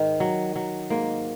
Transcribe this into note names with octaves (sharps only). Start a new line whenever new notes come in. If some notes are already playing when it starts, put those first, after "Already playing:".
Already playing: G#2 D#3
F#3
F#3
G#2 A#3